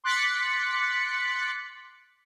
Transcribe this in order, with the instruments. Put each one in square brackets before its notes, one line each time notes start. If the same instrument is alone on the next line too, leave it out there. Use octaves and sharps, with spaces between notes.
[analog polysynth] C6 D6 F#6 A6 B6 C#7